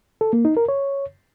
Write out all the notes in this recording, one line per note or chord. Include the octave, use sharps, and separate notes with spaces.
A4
A#3
D#4
A#4
C#5